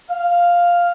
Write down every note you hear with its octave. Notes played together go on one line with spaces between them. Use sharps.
F5